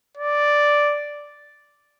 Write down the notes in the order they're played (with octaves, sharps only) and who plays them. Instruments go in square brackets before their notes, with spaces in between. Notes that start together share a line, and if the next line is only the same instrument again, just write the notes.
[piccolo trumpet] D5